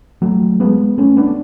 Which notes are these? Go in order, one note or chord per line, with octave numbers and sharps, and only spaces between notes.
F#3 A3
G#3 B3
A3 C#4
B3 D4